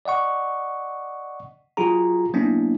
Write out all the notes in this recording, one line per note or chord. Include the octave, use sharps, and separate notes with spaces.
D5 D#5 F#5 C#6
F#3 F4 F#4 G#4 A#5
F#3 A#3 B3 C#4 D4 E4